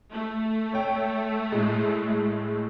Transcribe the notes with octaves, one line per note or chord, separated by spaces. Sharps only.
A3
C#5 G5
A2 G#3